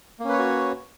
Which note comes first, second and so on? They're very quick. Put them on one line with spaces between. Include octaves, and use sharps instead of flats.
A#3 C#4 B4 C#5 F#4